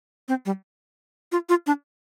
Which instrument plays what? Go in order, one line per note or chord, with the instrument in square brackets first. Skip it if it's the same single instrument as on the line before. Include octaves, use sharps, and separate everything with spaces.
[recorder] C4
G3
F4
F4
D4